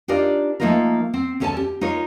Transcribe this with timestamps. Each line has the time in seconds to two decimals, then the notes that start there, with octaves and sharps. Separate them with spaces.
0.08 D4 D#4 F4 G4 A#4 D5
0.60 F3 A3 A#3 D#4 F4 A#4
1.14 C4
1.40 D2 C#4 A4 C#5 G#5 A5
1.57 G4
1.81 D#4 F4 A#4 C#5